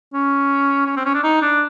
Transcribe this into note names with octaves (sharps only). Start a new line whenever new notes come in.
C#4
C#4
C4
C#4
D4
D#4
D4